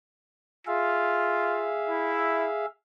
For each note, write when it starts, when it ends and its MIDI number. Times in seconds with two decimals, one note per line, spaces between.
0.67 1.74 65
0.67 2.66 68
0.67 2.66 76
0.67 2.66 77
1.89 2.48 64